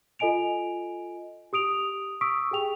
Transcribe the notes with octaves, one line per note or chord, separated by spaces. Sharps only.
F4 A4 D#5 G#5 D7 F7
G4 D#6 D7 F7
C#6 D#6 E6 B6 D7
G4 G#4 G5 F7